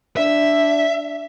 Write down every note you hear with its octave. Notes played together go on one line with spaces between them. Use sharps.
D4 E5